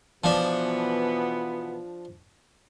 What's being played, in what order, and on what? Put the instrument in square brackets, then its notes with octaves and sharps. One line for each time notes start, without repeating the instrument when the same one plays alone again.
[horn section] B2 E3 B3 [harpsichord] F3 D4